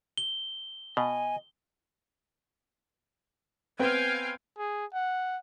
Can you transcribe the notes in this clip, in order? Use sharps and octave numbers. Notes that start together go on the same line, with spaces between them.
G7
B2 D#5 G#5
B3 C4 B4 F5 G5 G#5
G#4
F#5